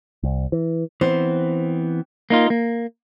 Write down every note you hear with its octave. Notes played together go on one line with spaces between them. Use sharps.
C2
E3
E3 B3 C4 C5
A#3 D#4 F4
A#3